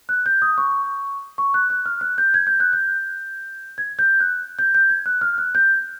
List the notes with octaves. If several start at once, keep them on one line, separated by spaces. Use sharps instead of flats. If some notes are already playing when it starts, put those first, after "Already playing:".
F#6
G6
D#6
C#6
C#6
F#6
F#6
F6
F#6
G6
G#6
G6
F#6
G6
G#6
G6
F#6
G6
G6
G#6
F#6
F6
F#6
G6